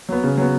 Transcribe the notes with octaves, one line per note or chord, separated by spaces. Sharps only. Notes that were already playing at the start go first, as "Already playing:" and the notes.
F#3 B3
C#3
F#3 B3